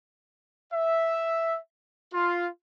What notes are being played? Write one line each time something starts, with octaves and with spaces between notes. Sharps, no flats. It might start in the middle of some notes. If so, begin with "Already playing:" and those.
E5
F4